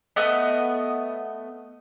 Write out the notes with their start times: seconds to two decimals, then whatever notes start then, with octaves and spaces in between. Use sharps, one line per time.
0.16 A3 B3 D#5